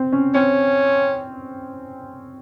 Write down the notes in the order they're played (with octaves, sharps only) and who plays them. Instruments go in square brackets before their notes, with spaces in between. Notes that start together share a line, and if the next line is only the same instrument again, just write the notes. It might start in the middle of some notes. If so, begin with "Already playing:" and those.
Already playing: [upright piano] C4
C#4
[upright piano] C4 [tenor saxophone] C#4